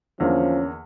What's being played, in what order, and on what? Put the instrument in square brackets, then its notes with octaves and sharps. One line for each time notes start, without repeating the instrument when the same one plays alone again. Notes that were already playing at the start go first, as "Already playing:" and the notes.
[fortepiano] E2 D3 A#3 [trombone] F3 [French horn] C#4